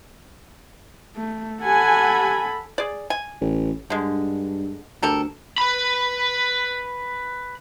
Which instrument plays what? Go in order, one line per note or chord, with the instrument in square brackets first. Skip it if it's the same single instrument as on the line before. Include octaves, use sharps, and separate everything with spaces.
[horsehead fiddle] A3
[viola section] G4 F#5 G#5 [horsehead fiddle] A4 B5
[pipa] G#4 D5
G#5
[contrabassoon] A1
[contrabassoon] G2 [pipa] D3 G#3
[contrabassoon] D2 [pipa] G3 A4 A#4
[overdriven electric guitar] B4 B5